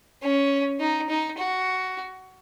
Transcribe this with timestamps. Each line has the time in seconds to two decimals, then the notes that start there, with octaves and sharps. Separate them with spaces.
0.22 C#4
0.80 D#4
1.09 D#4
1.38 F#4